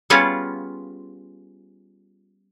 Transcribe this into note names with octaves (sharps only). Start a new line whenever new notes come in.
G3 B3 C#4 F4 G#4